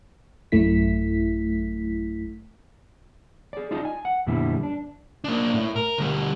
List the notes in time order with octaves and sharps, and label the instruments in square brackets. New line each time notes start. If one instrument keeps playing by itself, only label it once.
[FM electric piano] A1 F#2 A3 E4 B6
[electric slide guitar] G#4 D5
D#4 F4 D5 D#5
G#5
F#5
F2 A#2 D3 G3 B3 E4
D4
[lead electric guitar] A#3 D4
A2
A#4
D2 G3